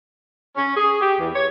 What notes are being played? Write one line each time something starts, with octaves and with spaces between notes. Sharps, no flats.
C#4
G#4
G4
E2
C#5